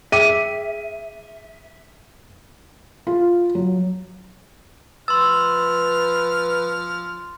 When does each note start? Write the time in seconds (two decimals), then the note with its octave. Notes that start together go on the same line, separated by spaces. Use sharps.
0.12 G#4 E5 G5 D6 D#7
3.07 F4
3.55 F#3
5.08 F3 B4 C6 E6 F6 A6